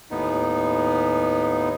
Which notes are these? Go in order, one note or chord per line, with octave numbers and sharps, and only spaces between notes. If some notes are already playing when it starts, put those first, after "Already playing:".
D#2 A2 B3 D#4